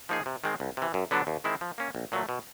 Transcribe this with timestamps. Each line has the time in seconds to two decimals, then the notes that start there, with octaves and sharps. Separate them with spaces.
0.09 F3 A#3 D#4 G#4
0.26 C3
0.44 D#3 G#3 C4
0.60 C2
0.77 C3 E3
0.94 F#2
1.11 D3 F#3 B3 D4
1.27 D#2
1.44 D#3 G#3 C4 E4
1.61 F3
1.78 A#3 C#4
1.95 A#1
2.12 A#2 F#3 A3
2.29 B2